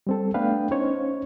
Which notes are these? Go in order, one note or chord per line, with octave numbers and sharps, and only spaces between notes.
G3 C4 A4
A3 B3 D4 B4 F5 G5
C#4 D#4 C5 C#5